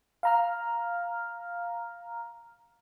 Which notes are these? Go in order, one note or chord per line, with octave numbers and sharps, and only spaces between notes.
F5 A#5 F6